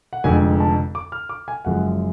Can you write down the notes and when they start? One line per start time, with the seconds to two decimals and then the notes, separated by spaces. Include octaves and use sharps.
0.13 F#5
0.24 F1 F2 D3 G#3 G#5
0.60 A5
0.95 D6
1.12 F6
1.29 D6
1.48 G#5
1.65 F#1 F#2 F3 G#3 F#5